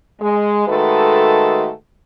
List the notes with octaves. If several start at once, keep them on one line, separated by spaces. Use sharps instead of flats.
G#3
D#3 G#3 A3 F#4 A4 B4